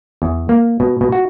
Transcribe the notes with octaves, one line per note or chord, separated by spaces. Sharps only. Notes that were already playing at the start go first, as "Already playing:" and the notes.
E2
A#3
B2
B2
F#4